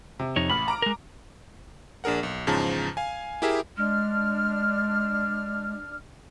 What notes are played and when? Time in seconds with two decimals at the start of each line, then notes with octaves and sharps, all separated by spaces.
0.19 C3
0.36 F2 D#4 C#5
0.49 A1 B5 F6 F#7
0.68 A#5 D6 D7
0.82 G#3 A#4
2.04 A#1 D4 G#4 A#4 F#5
2.23 B1
2.47 E2 G#2 C#3 F3 A5 A#5
2.97 F5 G#5
3.42 E4 G4 G#4 A#4 E5
3.77 G#3 D4 F6